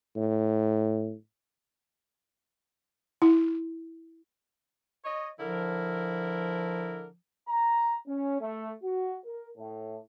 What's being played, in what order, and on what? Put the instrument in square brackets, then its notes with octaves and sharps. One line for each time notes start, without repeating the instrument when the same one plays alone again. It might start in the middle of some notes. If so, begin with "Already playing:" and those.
[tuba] A2
[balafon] E4
[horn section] C#5 D#5
[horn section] D3 E4 A#4 [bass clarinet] F3
[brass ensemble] A#5
C#4
A3
F#4
A#4
A2